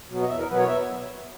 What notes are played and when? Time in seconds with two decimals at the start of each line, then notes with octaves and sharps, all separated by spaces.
0.09 B2 F#3 B3
0.22 D#5
0.28 E2 E5
0.39 A#4
0.49 B2 F#3 B3 B4
0.58 C#5
0.68 E5